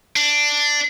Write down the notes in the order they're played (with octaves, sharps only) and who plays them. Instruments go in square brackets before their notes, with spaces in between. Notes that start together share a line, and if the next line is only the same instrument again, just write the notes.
[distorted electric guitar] D4